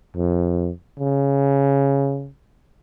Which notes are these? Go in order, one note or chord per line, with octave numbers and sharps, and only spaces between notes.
F2
C#3